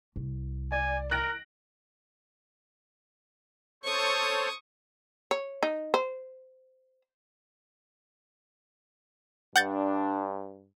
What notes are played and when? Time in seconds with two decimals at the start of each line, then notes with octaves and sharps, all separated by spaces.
0.16 C2
0.72 D5 G#5
1.11 A#4 F#6 A#6 D7
3.84 A4 C5 C#5 C#6 D#6
5.31 C#5
5.63 D#4
5.94 C5
9.56 G2 D4 F#5 G6 A6